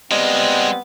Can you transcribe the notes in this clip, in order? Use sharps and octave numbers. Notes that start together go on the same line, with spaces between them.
G3 G#3 B3 C4 F4 D#5 F#5